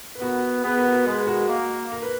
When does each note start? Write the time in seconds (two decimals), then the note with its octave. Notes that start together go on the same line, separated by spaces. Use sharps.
0.15 B4
0.22 B3 F#4 A#4
0.63 B3 G#4 B4
0.77 F#4 A#4
0.92 F#4 A#4
1.06 G#3 G#4 B4
1.27 F#4 A#4
1.48 A#3
1.92 A#4
2.02 B4